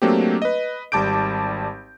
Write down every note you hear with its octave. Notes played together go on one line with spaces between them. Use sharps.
F#3 A3 A#3 C4 D4 G4
B4 D#5
G#1 G3 A5 D6 G6 D7